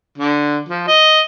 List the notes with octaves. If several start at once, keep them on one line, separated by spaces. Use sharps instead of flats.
D3
F3
D#5